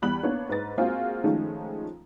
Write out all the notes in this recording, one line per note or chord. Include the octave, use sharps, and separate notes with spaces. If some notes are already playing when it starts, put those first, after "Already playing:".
E2 G3 B5 F#6 F#7
A#3 B3 D4 C#5
G#2 B4 A6
G#3 A#3 C4 F4 F#4 G#4
D#3 F3 G#3 A3 C#4 D#4